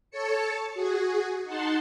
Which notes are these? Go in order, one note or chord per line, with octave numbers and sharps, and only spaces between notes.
A4 C#5 A5 C#7
F#4 G#4
D#4 F#5 A5 C6